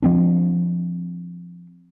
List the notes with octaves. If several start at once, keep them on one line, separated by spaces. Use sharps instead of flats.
F3 C4 D4